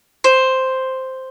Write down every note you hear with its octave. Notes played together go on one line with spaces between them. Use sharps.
C5